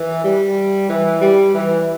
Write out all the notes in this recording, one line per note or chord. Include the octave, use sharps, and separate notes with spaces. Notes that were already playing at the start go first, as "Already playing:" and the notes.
Already playing: E3
G3
E3
G3
E3